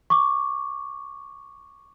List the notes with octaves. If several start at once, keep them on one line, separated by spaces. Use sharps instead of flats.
C#6 D6